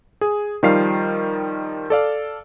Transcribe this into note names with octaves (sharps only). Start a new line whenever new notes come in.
G#4
D#3 F3 G3 F5 C7
A4 D5 F5